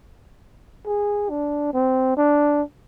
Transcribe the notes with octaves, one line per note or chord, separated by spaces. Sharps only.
G#4
D4
C4
D4